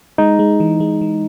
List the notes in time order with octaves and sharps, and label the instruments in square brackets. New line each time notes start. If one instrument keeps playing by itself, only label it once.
[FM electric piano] G#3 [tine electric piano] D#4
[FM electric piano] G#3
E3
G#3
E3